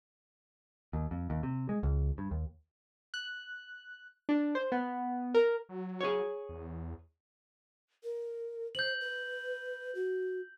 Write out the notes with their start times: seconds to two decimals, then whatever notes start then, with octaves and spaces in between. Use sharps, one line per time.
0.93 D#2
1.11 F2
1.30 D#2
1.43 C3
1.69 G#3
1.83 C#2
2.18 G2
2.31 D#2
3.14 F#6
4.29 D4
4.55 C5
4.72 B3
5.34 A#4
5.69 F#3
6.01 G#4 C#5
6.49 E2
8.04 A#4
8.75 C5 G6 F#7
9.01 B4
9.95 F#4